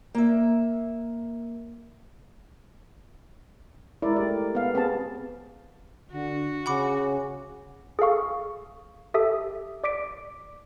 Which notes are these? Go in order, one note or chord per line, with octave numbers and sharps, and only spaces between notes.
A#3 E5
G#3 E4 A#4 D5
A3 G4 D5
B3 F5
B3 C4 G#4 A5
D3 F#4
C#3 F#5 B5 D6
G#4 A4 F5 C#6
G4 A4 E5 D#6
D5 D6 B6 D7